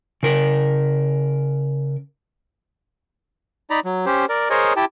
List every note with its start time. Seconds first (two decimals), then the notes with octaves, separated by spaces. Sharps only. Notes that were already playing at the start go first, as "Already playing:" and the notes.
0.23 C#3 A#4
3.70 D#4 D5 A#5 B5
3.85 F#3
4.06 C#4 G4 C5
4.29 A#4 D5
4.50 G#4 A#4 C5 C#5 D#5
4.76 E4 G4 G5 A5